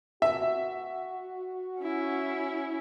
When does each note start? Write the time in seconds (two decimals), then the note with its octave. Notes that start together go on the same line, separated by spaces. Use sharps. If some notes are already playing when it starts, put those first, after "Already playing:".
0.22 F#4 E5
1.82 C#4 E4